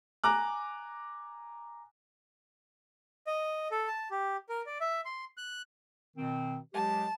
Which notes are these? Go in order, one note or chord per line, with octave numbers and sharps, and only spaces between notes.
G#5 A#5 D6 F#6
D#5
A4
A5
G4
A#4
D5
E5
C6
F#6
B2 D#3 C4
F#3 G#3 G4 A5